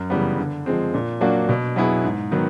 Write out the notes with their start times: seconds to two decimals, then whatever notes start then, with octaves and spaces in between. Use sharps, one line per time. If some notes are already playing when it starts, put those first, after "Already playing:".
Already playing: F#2
0.10 C#3 E3 G3 B3
0.38 D3
0.66 F3 G#3 C4
0.94 A#2
1.21 F#3 A#3 D4 F#4
1.49 B2
1.76 F#3 B3 E4 G#4
2.04 G#2
2.31 D#3 F#3 B3